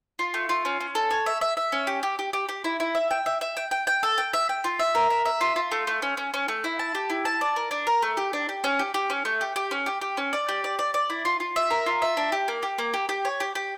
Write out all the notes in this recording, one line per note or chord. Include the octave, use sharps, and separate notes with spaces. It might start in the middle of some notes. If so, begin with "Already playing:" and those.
F4
A3
F4
C#4
C#4
A4
C#5
E5
E5
E5
C#4
G4
G4
G4
G4
G4
E4
E4
E5
G5
E5
E5
G5
G5
G5
A4
G5
E5
G5
F4
E5
A#4
E5
E5
F4
F4
A3
A3
C#4
C#4
C#4
A3
E4
A5
G4
E4
A5
D5
A#4
D4
A#4
A3
G4
D4
G4
C#4
G4
G4
C#4
A3
G4
G4
C#4
G4
G4
C#4
D5
G4
D5
D5
D5
E4
F4
F4
E5
A#4
F4
E5
D4
G4
A#3
G4
A#3
G4
G4
C#5
G4
G4